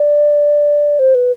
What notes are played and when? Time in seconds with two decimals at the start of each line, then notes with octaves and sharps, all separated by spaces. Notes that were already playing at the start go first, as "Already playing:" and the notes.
Already playing: D5
0.99 C5
1.15 B4